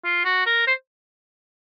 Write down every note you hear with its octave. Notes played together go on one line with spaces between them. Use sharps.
F4
F#4
A#4
C5